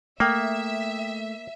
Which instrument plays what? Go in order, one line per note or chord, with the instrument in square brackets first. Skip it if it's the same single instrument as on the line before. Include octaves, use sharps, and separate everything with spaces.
[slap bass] A3 [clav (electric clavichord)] A#3 [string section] E5 [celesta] G5 D#6